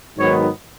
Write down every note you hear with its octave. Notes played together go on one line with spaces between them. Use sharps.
G#2 D#3 F#3 B3 C#5